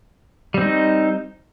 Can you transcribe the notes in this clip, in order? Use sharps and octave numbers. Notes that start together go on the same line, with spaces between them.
G3 C4 D#4